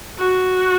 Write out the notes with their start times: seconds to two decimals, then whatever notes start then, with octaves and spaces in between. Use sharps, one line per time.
0.18 F#4